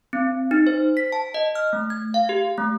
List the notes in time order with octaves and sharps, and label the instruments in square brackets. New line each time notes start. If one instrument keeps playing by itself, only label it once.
[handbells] C4
D#4
C5
B6
A5
D#5
F6
A3
G#6
F5
G4
A3